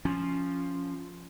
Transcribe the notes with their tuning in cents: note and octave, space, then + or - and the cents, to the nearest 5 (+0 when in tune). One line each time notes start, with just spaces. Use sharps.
F3 +0 C#4 +0